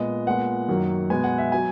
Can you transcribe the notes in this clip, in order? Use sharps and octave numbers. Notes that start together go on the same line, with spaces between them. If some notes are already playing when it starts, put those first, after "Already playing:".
Already playing: A#2 G#3 B3 D#5
A#2 G#3 B3 F#5
F#2 D#3 F#3 A#3
B2 G#3 B3 G#5
F#5
E5
F#3 B3 G#5